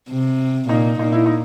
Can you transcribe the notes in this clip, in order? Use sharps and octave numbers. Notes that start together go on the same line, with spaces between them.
C3
A#2 D#4
A#2 D#4
E4
D#4